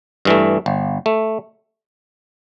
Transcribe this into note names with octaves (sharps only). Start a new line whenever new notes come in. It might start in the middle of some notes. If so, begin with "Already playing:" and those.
G2 E3 A3
G1
A3